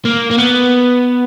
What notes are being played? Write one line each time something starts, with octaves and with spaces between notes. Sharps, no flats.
A#3
A#3
B3